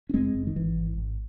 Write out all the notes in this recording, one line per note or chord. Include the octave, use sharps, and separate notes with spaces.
C#4
F#1 G#3 C4
F#1
D#3
G#1 E3
G#1
G#1